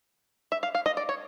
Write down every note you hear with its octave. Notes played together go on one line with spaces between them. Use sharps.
E5
F5
F5
D#5
D5
C#5